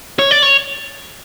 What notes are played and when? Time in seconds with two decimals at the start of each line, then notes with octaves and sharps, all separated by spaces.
0.19 C#5
0.31 D5
0.43 C#5